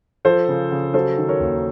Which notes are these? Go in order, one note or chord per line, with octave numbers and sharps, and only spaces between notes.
F3 A4 C5
C#3
C#3
F#3 A4 C5
D#3
A#4 C#5
D#2